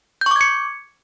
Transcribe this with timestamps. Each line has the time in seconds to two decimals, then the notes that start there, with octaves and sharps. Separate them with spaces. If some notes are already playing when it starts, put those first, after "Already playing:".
0.21 G6
0.26 C#6
0.31 D6
0.36 G#6
0.41 C#7